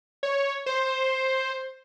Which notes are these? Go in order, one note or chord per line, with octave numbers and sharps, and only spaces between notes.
C#5
C5